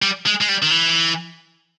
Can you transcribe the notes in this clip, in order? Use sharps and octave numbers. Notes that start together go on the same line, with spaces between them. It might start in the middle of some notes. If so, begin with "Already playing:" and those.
G3
G#3
G#3
G3
D#3
E3